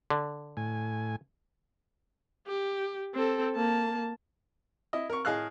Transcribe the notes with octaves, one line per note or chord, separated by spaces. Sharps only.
D3
A2 G#5
G4
C4 A4
A#3 A5
E4 D#5
A#4 C#6
A2 G#4 D#5 F5 F6 F#6